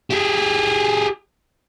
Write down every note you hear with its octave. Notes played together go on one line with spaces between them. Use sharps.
G4 G#4